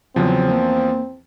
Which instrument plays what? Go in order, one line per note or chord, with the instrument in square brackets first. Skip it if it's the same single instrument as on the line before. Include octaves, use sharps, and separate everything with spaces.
[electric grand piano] E2 F3 [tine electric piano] C#3 F#3 [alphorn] C4
[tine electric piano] A#3